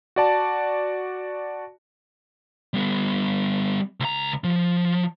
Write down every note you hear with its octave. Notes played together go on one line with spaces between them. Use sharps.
F#4 D5 A5
G3 B3
C#2 A#5
F3